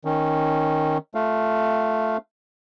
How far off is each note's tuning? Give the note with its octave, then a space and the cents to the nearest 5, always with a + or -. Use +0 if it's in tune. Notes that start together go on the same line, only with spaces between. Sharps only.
D#3 +0 C#4 +0
A3 +0 F4 +0 F5 +0